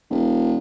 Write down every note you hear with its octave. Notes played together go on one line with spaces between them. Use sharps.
E1